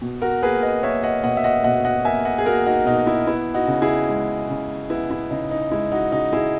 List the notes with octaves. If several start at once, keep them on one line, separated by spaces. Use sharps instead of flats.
B2
F#4 A#4
A#3 G#4 B4
B4 D#5
A#3 C#5 E5
D#5 F#5
B2 D#5 F#5
E5
D#5 F#5
B2 D#5 F#5
D#5 F#5
A#3 E5 G#5
D#5 F#5
G#4
A#3 F#4 A#4
D#4 F#4
B2 D#4
E4
B3 E4
D#4 F#4
C#3
E4 G#4
G#3
C#3
B3 E4
E4
C#3 D#4
D#4
G#3 E4
D#4 F#4
C#3 D#4 F#4
E4 G#4